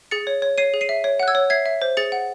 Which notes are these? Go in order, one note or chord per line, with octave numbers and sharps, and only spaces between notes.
G#4 A6 C#7
C#5
C#5
C#5 C7 D#7
G#4
C7 D#7
E5
C#5
F#5 F#6
E6 G#6
C#5
E5 G#6 C7
E5
C5
G#4 A6 C#7
F#5